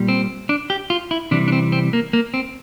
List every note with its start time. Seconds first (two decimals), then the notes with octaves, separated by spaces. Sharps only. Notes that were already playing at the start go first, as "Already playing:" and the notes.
Already playing: A#2 G3
0.09 C4
0.49 D4
0.70 G4
0.90 F4
1.11 E4
1.31 C3 E3 G3 D4
1.48 D4
1.52 C4
1.72 C4
1.93 A#3
2.13 A#3
2.34 C4